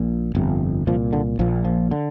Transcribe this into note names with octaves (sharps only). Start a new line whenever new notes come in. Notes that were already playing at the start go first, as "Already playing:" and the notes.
Already playing: A#1 A#2
G1 F2 C3
C2 A#2 F3
D3
A#1 A#2 F3
F3
D3